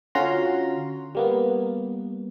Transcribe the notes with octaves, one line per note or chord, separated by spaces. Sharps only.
D3 C#4 F4 F#4 A#5 C6
G3 A#3 B3